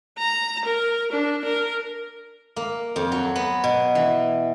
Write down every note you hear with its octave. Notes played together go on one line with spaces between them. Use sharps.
A#5
A#4
D4
A#4
A#3
F2
F#3
B3
B2
E3